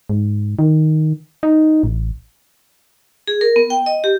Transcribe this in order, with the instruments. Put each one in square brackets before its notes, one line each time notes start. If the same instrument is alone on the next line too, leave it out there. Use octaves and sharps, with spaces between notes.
[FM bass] G#2
D#3
D#4
A1
[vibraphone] G#4
A#4
B3
G5
D#5
G4